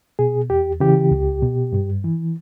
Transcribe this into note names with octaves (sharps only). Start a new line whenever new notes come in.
B2 G#4
E2 G4
C#3 E3 G4
C#2
B2
G2
E3